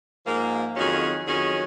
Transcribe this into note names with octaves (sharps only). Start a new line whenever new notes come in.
G#2 F3 A#3
F2 D#3 F#3 C#4 G#4
F2 D#3 F#3 C#4 G#4